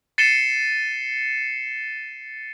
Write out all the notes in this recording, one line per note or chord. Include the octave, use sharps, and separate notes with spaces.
A6 C7 C#7 D#7 E7 G7